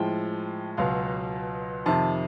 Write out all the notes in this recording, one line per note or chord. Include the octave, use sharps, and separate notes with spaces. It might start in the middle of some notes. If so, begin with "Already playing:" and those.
Already playing: A2 F3 G#3 G5
C#2 B2 F#3 F5
F2 C3 D#3 A5